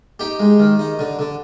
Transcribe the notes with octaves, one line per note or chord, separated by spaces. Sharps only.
D#4 G4
G#3
D#3
D#4
D3
D3